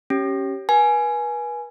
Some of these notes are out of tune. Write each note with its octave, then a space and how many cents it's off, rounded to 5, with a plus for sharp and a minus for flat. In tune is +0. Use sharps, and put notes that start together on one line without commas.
C#4 -10 G4 -20
B4 -40 G#5 +10